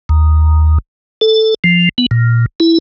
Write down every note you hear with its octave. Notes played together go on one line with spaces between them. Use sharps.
D#2
A4
F3
B3
A#2
E4